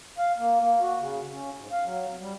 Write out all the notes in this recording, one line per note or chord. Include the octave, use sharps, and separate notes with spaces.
F5
A#3
A#3
F#4
C#3
C#4
G#2
F5
F#3
F2
G3